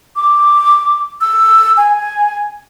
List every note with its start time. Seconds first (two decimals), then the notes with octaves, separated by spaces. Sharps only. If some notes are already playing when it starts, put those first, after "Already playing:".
0.16 D6
1.21 E6
1.77 G#5